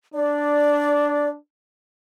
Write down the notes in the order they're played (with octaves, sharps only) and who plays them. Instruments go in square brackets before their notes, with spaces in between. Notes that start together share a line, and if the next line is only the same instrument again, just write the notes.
[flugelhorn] D4 [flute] D5